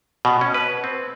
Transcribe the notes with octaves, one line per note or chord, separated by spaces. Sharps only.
B2
C#4
B4
C4